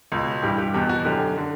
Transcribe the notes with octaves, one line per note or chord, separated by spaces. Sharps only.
C#2 B2
G2 E3 G4
G4
E2 B2 G4
F#4
F#2 D3 G4
D3